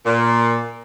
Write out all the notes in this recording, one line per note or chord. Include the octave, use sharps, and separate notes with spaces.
A#2